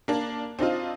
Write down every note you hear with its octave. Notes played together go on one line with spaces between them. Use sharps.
A#3 D4
C4 D4 D#4 F4